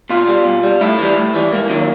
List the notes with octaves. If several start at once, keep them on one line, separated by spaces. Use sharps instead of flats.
B2 F4
G3
B2
G3
A2 E4
E3 G3
A2
E3 G3
G#2 A#3
D#3 F#3